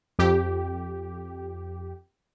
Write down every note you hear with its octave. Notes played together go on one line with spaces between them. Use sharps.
F2 G4